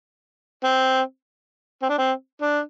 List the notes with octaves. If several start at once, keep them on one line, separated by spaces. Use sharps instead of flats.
C4
C4
D4
C4
D4